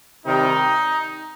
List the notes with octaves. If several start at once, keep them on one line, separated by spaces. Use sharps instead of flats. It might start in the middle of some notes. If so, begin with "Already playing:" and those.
C3 D#3 G3 C4 D#4